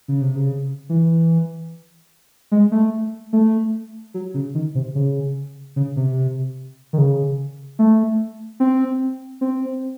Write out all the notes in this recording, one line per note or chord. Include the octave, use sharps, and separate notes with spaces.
C#3
C3
C#3
E3
G#3
A3
A3
F#3
C#3
D#3
C3
C#3
C#3
C3
D#3
C#3
A3
C4
C4